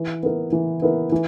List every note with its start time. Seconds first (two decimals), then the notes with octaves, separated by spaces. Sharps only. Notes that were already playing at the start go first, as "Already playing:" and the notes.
Already playing: E3
0.23 B3 E4 A#4
0.52 E3
0.82 B3 E4 A#4
1.12 E3